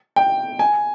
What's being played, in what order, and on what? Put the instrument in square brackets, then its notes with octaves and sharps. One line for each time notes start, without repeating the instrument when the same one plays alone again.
[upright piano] G5
G#5